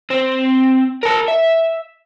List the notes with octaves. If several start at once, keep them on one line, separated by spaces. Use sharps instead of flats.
C4
A#4 A5
E5